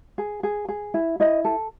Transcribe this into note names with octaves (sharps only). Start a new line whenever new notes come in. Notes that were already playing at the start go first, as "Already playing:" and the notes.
G#4
G#4
G#4
E4
E4 D#5
A4